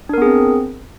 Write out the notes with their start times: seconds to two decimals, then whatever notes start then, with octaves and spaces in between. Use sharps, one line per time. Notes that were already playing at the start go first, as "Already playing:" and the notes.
0.09 D4
0.14 A#4
0.18 B3
0.22 G#4
0.26 C4